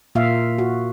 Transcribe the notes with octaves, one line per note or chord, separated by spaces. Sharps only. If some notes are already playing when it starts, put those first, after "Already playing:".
A#2 A#3 F4 E5 F5
F#4